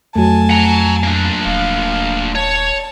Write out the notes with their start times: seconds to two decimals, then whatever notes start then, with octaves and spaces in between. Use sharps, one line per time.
0.16 F2 F#3 A3 G#5 A5
0.50 F#5 A#5
1.03 A#3 D4
1.46 D#1 F5
2.35 C#5 A5